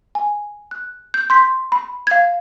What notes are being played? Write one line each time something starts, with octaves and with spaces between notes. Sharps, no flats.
G#5
F#6
G6
C6 G6 B6
B5
F5 G#6